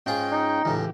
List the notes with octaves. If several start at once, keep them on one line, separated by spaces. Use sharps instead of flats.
G#2 C#4 F4 G#4 G5
D#4
C#2 A2 E3 G4